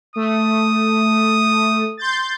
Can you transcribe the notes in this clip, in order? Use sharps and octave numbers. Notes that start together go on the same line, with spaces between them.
A3 D#6
C6 G6 A6